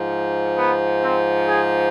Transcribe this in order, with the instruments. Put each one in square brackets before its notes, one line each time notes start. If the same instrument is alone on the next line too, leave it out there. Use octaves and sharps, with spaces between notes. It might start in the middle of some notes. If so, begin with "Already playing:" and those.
Already playing: [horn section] G#2 F3
B3
C4
G#4